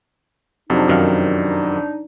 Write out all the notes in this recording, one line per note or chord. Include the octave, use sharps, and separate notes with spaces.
F2 C3 F#3 D4 D#4
F#2 D#3 F5